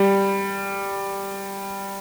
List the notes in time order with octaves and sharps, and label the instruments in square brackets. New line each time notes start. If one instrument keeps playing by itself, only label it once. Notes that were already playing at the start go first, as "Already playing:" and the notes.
Already playing: [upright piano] G3